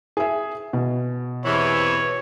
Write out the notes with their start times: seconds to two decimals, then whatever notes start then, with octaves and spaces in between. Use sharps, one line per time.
0.17 G#4 E5
0.73 B2
1.45 E2 C3 E3 C#5